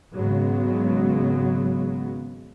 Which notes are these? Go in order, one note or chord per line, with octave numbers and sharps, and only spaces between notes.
G#1 C#3 F#3 G#3 B3